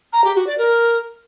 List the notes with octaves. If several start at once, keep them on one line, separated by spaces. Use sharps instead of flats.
A#5
G4
F#4
D5
A#4